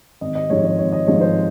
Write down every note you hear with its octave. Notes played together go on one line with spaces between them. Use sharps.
G#1 D#5
D#5
G#2 F3 G#3 C#5
C#5
G#1 C#5
D#5
G#2 F3 G#3 C#5
C5